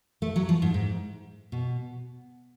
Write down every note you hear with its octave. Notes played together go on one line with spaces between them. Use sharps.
A3
F#3
F3
G#2
G#2
B2